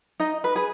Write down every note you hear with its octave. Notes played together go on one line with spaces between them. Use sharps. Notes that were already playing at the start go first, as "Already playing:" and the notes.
D#4 D#5
B4
G#4 B4